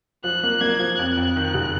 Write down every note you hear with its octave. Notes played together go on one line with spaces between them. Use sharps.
F3 F#6
A#3
A#3 G#6
F3
F2 F#6
F2
D#3
F#1